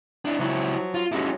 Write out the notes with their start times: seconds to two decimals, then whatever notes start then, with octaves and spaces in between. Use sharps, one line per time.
0.25 D4 E4
0.39 C#2 F3 F#3 E4
0.94 F4
1.12 D#2 F#3 G#3 C#4 E4